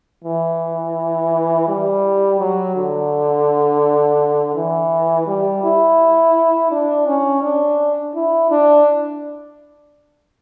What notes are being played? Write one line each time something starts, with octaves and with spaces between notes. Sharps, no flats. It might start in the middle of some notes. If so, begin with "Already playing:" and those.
E3
G3
F#3
D3
E3
G3
E4
D4
C#4
D4
E4
D4